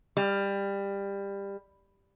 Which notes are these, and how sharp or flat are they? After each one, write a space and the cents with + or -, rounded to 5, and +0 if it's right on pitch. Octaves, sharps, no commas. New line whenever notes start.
G3 +20